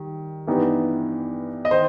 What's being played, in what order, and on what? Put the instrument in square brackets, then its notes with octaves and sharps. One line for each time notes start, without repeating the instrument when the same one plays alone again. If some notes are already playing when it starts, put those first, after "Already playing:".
Already playing: [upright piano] D#3 G3
G2 E3 B3 D#4 G4
[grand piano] D#5
[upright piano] D#3 [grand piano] C5